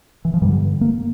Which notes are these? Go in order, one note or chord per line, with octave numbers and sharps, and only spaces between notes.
E3
F3
G2 D3 G3
A#3